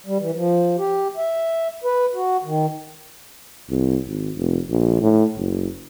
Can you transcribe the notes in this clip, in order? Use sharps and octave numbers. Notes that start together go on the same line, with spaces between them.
G3
E3
F3
G4
E5
B4
F#4
D#3
C2
G#1
F1
A#1
A2
F#1